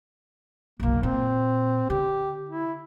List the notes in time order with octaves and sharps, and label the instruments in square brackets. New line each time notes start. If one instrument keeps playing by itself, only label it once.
[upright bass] F#1 B1 [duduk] A#3
[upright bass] A#2 [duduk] C4
[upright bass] D3 [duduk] G4
[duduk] E4